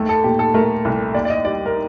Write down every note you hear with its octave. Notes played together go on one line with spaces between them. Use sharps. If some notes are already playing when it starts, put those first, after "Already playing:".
Already playing: D#2 A3
A4
A#2 G4
A4
A3 A#4
C2
D#2 D5
D5
D#5
G3 D5
A#4